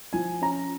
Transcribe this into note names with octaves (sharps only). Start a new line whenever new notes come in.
F3 G#5
C#4 A#5